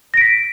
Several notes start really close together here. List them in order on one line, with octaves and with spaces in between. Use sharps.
A#6 D7 B6